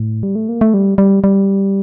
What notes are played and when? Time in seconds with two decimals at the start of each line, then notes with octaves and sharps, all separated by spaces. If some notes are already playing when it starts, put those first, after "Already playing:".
Already playing: A2
0.23 G3
0.35 A3
0.49 A#3
0.61 A3
0.74 G3
0.98 G3
1.24 G3